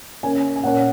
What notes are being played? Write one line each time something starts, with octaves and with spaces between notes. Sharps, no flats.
C#3 A#3 C#4 G#5
G#5
A#2 A#3 C#4 F#5